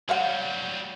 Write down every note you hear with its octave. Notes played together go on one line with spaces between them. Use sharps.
F#3 G3 C#5 F5 F#5